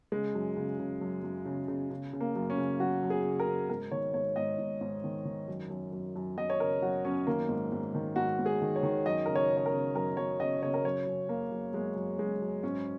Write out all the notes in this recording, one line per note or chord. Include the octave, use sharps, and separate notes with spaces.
C#3 G#3
F#2
C#3
C#3
F#2
F#2
C#3
C#3
C#3
C#3
A#3
F#2
C#4
C#3
F#2 F#4
F#2
G#4
C#3
A#4
C#3
G#2 A#4
D#3 C#5
G#2 C#5
G#2 D#5
G#2
G#2
D#3
D#3
F#2
F#2
F#2
F#2
F#2 D#5
C#5
C#3 A#4
F#2 F#4
F#2 C#4
D#3 A#3
G#2
G#2
D#3
G#2 F#4
G#2
G#4
D#3
C#5
D#3
F#2 D#5
C#3 A#4
C#5
C#3
C#5
A#4
C#3
F#2 A#4
F#2 C#5
C#3 D#5
C#3 C#5
A#4
F#2 C#5
F#2
F#2 A#3
F#2
F#2 G#3
F#2
F#2 G#3
F#2
G#2 C#4